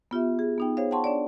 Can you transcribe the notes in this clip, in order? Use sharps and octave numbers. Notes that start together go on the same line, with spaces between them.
B3 F4 G4 E5
G#4
B3 D#4 G5
G#4 C5 C#5 F5
F#5 G5 A5 C6 C#6
D4 C#5 D5